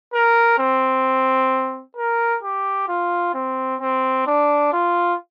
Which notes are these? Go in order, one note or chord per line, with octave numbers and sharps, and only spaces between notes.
A#4
C4
A#4
G4
F4
C4
C4
D4
F4